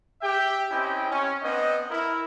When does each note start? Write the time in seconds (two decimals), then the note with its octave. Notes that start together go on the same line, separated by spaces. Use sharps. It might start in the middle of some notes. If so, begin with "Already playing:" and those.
0.21 G4 E5 G5
0.71 C4 C#4 E4 G4 D#5 G5
1.11 C#4
1.42 B3 C4 D4 D#5
1.89 E4 A#4 E5